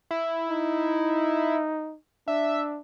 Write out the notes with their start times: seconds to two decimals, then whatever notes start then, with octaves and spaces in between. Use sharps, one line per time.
0.11 E4
0.50 D#4
2.28 D4 E5